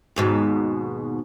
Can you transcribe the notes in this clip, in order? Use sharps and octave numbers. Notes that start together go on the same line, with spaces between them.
D#2 G#2 B2